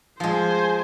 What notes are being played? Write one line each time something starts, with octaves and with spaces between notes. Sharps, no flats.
F3 G#3 C5 G#5